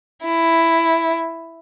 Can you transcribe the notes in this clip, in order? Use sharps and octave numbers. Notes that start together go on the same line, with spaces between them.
E4